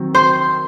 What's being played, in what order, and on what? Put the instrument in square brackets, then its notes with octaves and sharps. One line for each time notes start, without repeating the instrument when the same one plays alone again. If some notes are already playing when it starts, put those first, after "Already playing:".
Already playing: [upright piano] D#3 F#3 C4
[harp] C5 C6